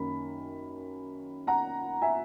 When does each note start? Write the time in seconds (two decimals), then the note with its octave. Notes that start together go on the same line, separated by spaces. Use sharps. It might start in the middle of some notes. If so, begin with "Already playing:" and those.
Already playing: F#2 D#3 A#3 C#4 B5
1.47 F#5 A#5
2.02 E5 G#5